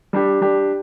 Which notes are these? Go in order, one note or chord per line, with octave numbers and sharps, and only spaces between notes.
G3 D4 G4
G3 D4 G4